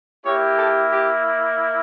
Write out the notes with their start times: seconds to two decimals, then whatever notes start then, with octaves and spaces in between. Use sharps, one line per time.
0.24 A#3 E4 G4 C#5
0.57 A4
0.90 G4